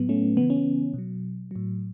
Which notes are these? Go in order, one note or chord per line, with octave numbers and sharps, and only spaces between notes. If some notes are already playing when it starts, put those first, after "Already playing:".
Already playing: A2 F#3 B3
A3 C#4
C#3 E3 B3
C#4
B3
B2 F#3
A2 F#3